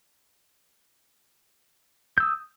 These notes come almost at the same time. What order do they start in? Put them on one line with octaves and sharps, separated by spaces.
G6 E6 D#6